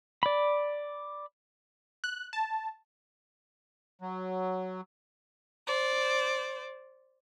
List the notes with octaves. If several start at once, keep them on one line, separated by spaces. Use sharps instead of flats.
D5 B5
F#6
A5
F#3
C5 D5